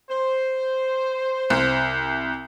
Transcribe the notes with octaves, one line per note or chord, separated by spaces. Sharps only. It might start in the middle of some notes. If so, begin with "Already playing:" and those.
C5
C2